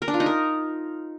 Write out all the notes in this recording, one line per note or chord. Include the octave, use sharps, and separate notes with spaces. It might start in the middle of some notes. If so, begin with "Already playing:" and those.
A#4
D4
F4
D#4
A#4